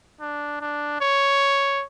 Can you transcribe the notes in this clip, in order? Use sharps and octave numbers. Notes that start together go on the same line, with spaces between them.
D4
D4
C#5